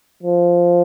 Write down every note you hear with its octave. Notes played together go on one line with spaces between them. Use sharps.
F3